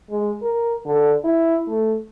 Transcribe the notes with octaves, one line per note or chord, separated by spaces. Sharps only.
G#3
A#4
D3
E4
A3